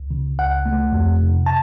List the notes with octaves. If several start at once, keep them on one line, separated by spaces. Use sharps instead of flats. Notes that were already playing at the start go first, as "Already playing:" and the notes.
Already playing: C#2
C#3
C#2 F#5
A3
F2
C3
A5